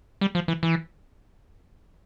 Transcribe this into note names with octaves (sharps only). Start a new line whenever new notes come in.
G3
F3
E3
E3